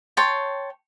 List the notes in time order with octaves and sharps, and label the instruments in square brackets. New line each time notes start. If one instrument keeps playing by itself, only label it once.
[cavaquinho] C#5 G5 A5 C6